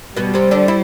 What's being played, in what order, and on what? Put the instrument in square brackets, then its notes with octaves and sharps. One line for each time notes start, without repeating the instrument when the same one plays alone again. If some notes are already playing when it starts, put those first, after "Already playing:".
[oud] B2 B3 [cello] G3
[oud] C3 C4
D3 D4
E4